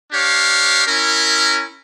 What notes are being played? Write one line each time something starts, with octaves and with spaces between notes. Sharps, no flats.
D4 G4 C#5 F5
C#4 E4 A#4